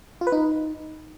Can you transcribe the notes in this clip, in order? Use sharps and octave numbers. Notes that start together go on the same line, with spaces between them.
F4
B4
D#4